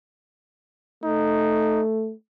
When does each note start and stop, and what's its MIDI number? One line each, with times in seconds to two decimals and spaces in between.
1.04 2.12 57
1.04 1.80 63